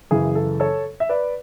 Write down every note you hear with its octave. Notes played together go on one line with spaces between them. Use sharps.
F#2 C#3 E3 G#4
A4
A4 C#5
E5
B4 D5